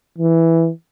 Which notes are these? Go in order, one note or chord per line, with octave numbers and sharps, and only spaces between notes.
E3